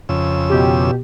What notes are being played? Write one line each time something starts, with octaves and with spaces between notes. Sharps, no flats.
F2 C#3 E6
B2 G4